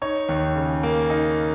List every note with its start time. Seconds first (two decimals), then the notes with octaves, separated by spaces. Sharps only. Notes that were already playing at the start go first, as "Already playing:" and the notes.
0.02 D#4 C#5
0.29 D#2
0.56 C#3
0.83 A#3
1.10 D#4